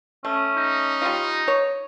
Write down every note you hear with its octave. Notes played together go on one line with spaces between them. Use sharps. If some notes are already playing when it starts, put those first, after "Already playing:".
A3 C#4
D#4
G3 F4
C#5